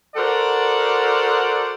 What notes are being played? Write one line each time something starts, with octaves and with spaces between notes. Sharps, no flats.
F#4 A4 A#4 C5 D5 F#5